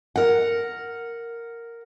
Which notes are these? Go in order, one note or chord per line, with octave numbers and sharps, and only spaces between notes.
A#4 F#5